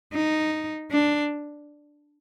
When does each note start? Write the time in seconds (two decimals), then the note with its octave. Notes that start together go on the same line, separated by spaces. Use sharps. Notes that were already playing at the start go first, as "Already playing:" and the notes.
0.14 D#4
0.92 D4